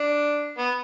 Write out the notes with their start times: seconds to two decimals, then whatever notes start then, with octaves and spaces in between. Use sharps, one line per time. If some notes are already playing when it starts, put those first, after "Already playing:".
Already playing: D4
0.58 B3